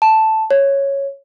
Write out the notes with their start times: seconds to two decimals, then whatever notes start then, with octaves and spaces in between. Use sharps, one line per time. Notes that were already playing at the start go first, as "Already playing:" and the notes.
0.02 A5
0.51 C#5